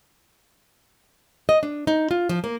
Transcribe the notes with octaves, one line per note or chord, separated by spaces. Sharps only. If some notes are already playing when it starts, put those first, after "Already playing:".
D#5
D4
D#4
F4
F3
A#3